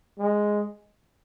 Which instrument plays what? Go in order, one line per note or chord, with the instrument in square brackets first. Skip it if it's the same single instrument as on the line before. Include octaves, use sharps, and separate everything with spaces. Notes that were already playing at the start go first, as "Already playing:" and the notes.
[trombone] G#3